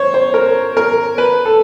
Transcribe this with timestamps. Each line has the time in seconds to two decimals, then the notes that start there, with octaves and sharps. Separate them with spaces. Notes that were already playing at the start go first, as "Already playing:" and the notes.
Already playing: C5 C#5
0.14 C5
0.34 A#4
0.77 A#4
1.18 B4
1.45 A4